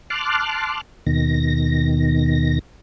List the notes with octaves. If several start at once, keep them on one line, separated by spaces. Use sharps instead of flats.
A5 C6 D6 F6 F#6
D#2 B2 D#3 A#6